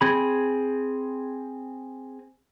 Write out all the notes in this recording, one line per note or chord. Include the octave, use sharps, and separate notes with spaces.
C4 G#4 B5